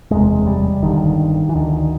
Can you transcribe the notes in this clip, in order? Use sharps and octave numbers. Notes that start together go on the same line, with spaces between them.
F#1 E2 C3 G#3
G3
G1 G2 D3 D#3
E3
D2 D3 D#3